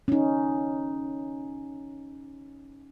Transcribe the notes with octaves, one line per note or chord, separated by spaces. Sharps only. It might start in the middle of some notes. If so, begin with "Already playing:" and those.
C#4 D#4